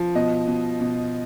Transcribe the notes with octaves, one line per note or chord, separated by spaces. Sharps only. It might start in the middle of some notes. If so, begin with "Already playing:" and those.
Already playing: F3
B2 D#5
B2
B2